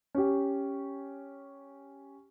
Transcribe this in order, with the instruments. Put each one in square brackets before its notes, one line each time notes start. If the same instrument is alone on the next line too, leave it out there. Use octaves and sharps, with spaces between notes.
[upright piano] C#4 G4